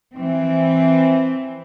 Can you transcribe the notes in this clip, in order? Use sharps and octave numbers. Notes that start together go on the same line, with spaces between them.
E3 C4